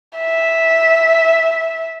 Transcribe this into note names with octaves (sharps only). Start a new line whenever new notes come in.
E5